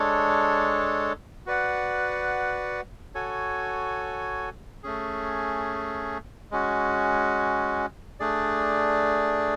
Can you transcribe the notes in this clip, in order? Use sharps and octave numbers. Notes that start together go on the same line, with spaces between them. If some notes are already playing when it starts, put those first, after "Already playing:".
Already playing: G#3 D4 A4 C#5
F#4 B4 D5 F#5
F#4 A4 C#5 G#5
A3 C#4 G#4
G#3 C#4 F#4
A3 D4 G#4 D5